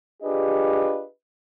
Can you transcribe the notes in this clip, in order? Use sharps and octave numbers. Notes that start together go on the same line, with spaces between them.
D4 F4 G4 G#4 B4 D#5